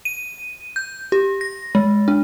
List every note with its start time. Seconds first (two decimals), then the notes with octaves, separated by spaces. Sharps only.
0.05 D#7
0.76 G6
1.12 G4
1.41 A#6
1.75 G#3
2.08 D4